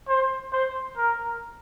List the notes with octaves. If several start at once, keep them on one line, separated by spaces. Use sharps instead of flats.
C5
C5
A#4